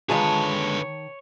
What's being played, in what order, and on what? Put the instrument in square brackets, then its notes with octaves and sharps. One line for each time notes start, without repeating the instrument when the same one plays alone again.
[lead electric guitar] D3 B4 [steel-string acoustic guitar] D#3 A5 [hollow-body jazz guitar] G#3 F4 G#4 [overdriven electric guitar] C#5